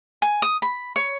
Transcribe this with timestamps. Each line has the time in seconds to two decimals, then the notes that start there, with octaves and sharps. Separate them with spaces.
0.22 G#5
0.42 D#6
0.62 B5
0.96 C#5